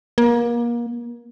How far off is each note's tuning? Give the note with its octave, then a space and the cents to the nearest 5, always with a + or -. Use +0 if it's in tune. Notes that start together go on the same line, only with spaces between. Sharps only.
A#3 +30